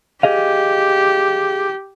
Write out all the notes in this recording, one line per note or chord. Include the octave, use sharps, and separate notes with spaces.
G4 G#4 D#5 F5